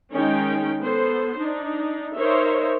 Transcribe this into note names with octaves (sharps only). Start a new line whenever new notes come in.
D#3 G#3 C#4 D#4 G5
B3 A4 C5
D4 D#4
D#4 A#4 C5 C#5 D#5 E5